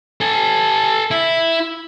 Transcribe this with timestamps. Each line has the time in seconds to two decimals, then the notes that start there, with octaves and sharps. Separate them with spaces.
0.21 A4 G#5
1.11 E4